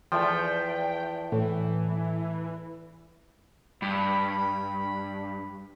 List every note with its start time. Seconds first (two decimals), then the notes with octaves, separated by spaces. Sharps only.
0.12 E2 F3 A3 G5
1.32 A2 E3
3.82 G2 B5